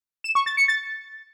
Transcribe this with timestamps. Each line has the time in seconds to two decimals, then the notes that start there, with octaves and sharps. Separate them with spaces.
0.24 E7
0.35 C#6
0.46 A6
0.57 C#7
0.68 A6